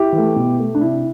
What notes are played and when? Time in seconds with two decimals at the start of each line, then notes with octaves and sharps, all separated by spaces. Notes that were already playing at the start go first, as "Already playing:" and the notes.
Already playing: E4 G4
0.12 E3
0.18 A3
0.36 B2
0.59 A3
0.75 D4
0.81 C3 E4